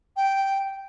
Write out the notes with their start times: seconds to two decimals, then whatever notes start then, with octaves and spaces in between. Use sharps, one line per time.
0.16 G5